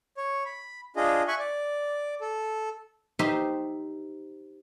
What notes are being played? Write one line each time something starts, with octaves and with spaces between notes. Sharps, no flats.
C#5
B5
D4 F4 G#4 D#5
E5 G#5 C#6 F#6
D5
A4
D#4 G4 C5 E5